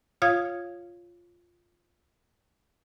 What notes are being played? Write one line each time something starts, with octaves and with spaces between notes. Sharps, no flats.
F4 C#5 F5 D#6 G#6